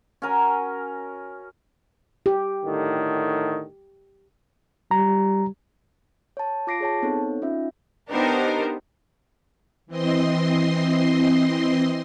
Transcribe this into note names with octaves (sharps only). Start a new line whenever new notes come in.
C#4 F#4 A#4 G#5
G4
A2 D3 D#3
G3 A#5
C#5 A5
F4 D6 A#6 C7 D7
G#4 C#5 A5
B3 C4 D#4 A4 C#5
C#4 D#4 F4 E5
B3 D4 D#4 G4 A#4 C5
E3 C4 D#5 C6